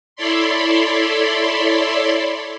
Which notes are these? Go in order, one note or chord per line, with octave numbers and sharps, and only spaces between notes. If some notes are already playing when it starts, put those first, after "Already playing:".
E4 A4 C#5 D5 B5 C6